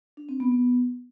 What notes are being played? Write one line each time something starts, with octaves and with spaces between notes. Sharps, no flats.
D4
C4
B3
B3